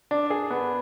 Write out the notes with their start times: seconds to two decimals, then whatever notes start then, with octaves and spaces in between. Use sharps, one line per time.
0.11 D4
0.30 G#4
0.51 B3